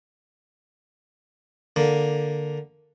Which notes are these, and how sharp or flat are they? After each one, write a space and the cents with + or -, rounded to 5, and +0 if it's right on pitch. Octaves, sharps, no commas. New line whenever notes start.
D3 +0 A#3 +0